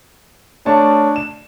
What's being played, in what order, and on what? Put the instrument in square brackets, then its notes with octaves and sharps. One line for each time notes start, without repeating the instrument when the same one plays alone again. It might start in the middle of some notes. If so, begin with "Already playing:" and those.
[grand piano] A3 C#5 A5 [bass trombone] D4
[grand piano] E7